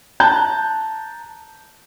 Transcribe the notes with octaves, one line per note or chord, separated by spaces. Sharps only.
A5 A#5 F#6 G6